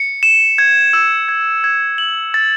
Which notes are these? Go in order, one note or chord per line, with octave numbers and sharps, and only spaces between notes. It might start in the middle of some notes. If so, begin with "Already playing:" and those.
Already playing: C#7
E7
G#6
E6
G#6
G#6
F#7
A6